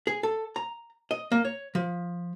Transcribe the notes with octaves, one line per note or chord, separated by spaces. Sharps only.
G#4
A4
A#5
D#5
A#3
C#5
F3